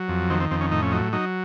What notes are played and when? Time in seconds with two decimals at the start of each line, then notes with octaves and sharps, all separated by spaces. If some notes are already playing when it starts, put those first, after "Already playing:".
Already playing: F#3
0.09 F2
0.30 D#3 C4
0.40 C4
0.51 F2 C4
0.61 C#4
0.72 A2 D#4
0.82 C#4
0.92 F#3 D#4
1.13 F#3 D#4